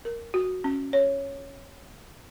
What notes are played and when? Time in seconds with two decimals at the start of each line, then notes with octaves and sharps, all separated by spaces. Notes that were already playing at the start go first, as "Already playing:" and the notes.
0.05 A#4
0.34 F#4
0.64 C#4
0.93 C#5